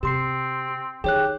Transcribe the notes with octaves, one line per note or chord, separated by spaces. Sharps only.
C3 C4 G4 C6 C7
D#3 G4 G#4 C#5 F#6